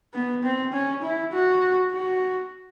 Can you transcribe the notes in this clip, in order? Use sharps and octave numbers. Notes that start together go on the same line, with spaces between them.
B3
C4
C#4
E4
F#4
F#4